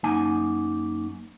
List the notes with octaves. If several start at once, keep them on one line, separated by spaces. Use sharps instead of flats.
F#2 A#3 D#4 G#5